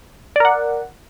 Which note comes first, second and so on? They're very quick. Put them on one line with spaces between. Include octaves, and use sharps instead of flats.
D5 A#4 F#5